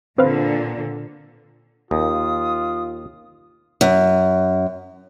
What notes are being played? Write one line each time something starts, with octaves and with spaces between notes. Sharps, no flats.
A#2 D3 C4 B4 F5
D#2 F4 D#6
F#2